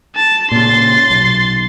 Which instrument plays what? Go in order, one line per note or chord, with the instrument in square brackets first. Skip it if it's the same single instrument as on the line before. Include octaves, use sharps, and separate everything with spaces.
[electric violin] A5
[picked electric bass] A#2 C#3 [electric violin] C6 A6
[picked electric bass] B1